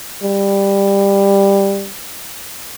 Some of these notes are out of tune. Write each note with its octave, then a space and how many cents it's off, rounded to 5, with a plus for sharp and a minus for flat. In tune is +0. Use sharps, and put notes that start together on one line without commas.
G3 +10